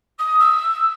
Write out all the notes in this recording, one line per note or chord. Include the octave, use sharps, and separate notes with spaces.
D#6
E6